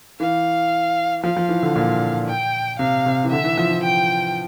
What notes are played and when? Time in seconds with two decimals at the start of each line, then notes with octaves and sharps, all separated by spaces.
0.20 E3 F5
1.23 F3 F5
1.37 F3
1.49 E3
1.63 D3
1.75 A#2
2.27 G5
2.79 C3 F5
3.06 C3
3.24 E3
3.32 D3 E5
3.44 E3
3.58 F3
3.71 E3
3.84 G5